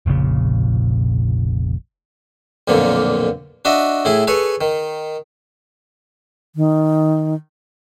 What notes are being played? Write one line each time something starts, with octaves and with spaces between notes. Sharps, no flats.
F1 A#1 A#2 C#3
B1 F2 A#2 D3 A#3
D4 F#4 D#5 E5
A2 E4 G#4
G#4 A4 B4 C#5
D#3
D#3